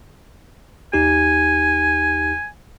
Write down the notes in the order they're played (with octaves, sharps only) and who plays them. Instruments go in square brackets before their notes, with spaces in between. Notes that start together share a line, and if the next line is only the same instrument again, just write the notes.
[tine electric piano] D#2 D#4 G4 [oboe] G#5